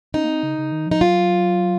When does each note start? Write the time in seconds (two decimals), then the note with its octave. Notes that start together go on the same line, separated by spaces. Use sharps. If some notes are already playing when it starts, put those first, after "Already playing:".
0.14 C#4 D#4
0.24 A#3
0.29 C4
0.43 C#3
0.58 C#3
0.72 D#3
0.87 F3 D#4
1.01 F#3 F4